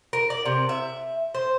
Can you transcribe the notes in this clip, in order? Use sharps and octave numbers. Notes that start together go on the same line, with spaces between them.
A#4
D5
C3
E5
C5